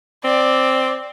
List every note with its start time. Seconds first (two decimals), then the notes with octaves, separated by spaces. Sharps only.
0.24 C4 D5